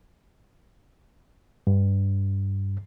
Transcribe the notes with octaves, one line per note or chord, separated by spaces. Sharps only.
G2